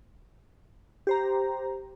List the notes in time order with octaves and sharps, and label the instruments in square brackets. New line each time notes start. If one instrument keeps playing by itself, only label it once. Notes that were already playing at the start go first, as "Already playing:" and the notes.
[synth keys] G4 C5 A#5